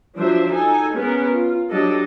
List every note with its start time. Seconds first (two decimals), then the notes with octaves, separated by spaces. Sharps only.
0.17 F3 F#3 D4 C5 E5
0.50 D#4 A4 G#5
0.94 B3 C#4 G#4 A#4
1.29 F4
1.70 F#3 D4 G4 A4 D#5